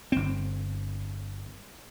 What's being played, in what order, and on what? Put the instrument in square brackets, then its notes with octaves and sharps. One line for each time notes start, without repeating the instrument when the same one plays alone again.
[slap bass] G1 C4